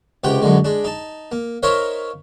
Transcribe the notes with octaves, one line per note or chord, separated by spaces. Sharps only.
C#2 C3 G4 F#5 G5
F#2 D3 G#3
G#3 D4
D#4 A5
A#3
D#4 A#4 C5 C#5 E5 F5